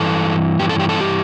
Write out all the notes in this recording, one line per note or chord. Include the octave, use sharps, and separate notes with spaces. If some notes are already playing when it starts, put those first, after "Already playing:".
Already playing: G2 E3 A4
G2 E3 G4
A4
G4
A4
G4